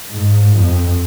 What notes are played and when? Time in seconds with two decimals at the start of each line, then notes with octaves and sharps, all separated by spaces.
0.14 G#2
0.56 F2